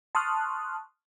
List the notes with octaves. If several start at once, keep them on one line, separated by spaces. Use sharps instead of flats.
A5 C6 C#6 D#6 F6 F#6